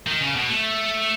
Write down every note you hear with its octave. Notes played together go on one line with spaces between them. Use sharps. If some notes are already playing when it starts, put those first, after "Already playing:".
D#3
C#3
B2
A3